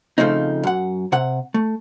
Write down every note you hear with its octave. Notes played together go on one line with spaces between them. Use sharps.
C#3 F3 A3 C4 D#4
F#2 F#5
C3 F#5
A3